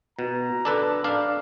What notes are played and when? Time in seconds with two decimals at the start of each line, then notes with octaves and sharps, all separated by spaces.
0.19 B2 A#5
0.65 D4 A4 B4
1.04 D4 F5